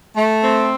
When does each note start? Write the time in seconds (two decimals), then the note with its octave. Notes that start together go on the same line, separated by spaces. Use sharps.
0.15 A3
0.43 C4